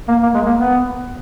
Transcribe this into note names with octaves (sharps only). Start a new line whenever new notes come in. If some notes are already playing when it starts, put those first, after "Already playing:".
A#3
A#3
G#3
A#3
B3